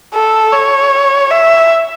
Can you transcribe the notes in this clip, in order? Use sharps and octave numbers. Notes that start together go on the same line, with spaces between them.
A4
C#5
E5